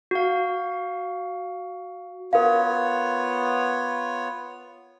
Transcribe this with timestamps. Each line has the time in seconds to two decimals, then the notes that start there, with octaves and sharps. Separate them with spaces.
0.11 F#4 F5
2.33 B3 F4 A#4 C#5 F5